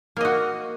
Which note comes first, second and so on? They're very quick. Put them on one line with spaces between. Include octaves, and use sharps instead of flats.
A#3 D#5 F#4